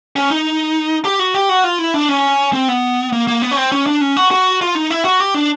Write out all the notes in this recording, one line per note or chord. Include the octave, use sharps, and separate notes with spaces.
C#4
D#4
G4
F#4
G4
F#4
F4
E4
D4
C#4
C4
B3
A#3
A#3
B3
C#4
C4
C#4
D4
C#4
F#4
F#4
F4
D#4
E4
F#4
G4
D4